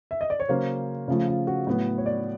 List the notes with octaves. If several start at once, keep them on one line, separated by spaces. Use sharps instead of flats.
E5
D#5
D5
C#5
C#3 F#3 A#3 C#4 C5
C#3 F3 A3
F4
F#4
A2 F#3 B3
C#5
D5